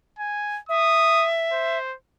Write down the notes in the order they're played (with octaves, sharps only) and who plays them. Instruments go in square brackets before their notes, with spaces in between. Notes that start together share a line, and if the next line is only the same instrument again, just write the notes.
[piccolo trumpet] G#5
[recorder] E5 [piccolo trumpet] D#6
[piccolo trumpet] C5